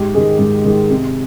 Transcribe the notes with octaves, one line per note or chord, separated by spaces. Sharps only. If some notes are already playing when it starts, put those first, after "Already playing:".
Already playing: G#2 G4
D#3 G#3 G#4
G#2
D#3 G#3
C3